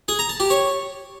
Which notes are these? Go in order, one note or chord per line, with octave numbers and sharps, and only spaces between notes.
G#4
A#5
A5
G4
C#5